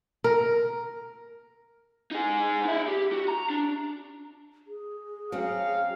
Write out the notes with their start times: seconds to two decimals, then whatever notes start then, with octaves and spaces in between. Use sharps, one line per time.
0.24 A#4
2.11 D#4 G#4
2.65 D#4 E5
2.88 G4
3.12 F#4
3.28 A#5
3.50 D4
4.67 G#4
5.32 F#3 C4 C#4 F5